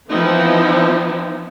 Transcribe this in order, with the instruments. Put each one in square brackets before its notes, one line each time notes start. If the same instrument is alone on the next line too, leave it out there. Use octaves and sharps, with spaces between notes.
[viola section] E3 F3 B3 C4 D#4 E4